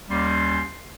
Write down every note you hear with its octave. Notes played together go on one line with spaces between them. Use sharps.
D#2 G3 C#4 C6